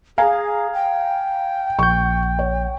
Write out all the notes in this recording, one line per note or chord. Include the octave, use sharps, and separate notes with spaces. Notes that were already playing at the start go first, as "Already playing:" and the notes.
G#4 F5 G#5 A#5
G5
A#1 C#6 G6
C#5